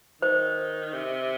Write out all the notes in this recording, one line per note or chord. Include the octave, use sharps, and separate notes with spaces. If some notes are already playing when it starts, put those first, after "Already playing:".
D#3 C5
C3